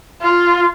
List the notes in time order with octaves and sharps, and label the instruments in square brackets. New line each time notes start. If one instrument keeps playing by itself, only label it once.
[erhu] F4